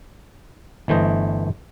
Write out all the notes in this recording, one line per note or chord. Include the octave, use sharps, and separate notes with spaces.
G1 E3 A3 C5 D#5